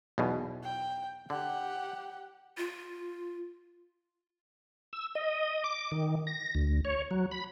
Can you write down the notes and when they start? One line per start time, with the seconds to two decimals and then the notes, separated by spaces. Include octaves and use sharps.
0.18 B1 E2 B2
0.64 G5
1.30 D3 G4 F#5
2.57 F4
4.93 E6
5.15 D#5
5.64 D6
5.92 D#3
6.27 A#6
6.55 D2
6.85 C#5
7.11 F#3
7.31 B5